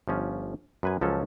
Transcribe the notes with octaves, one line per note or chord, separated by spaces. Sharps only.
G1 F3 C#4
F#2 B4 G#5
C#2 F3 F#3 C#4 A4